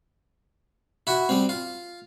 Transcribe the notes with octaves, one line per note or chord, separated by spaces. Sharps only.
E4 F#4
G3 C4
F4